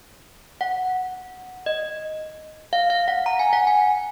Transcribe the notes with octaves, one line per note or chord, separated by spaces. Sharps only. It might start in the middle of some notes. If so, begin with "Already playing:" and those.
F#5
D#5
F5
F5
F#5
A#5
G#5
F#5
G#5